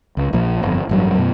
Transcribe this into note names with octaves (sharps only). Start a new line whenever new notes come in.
C#2
A#1 A#2 F3
G1 F2
A1 G2 F#3
F#2 B2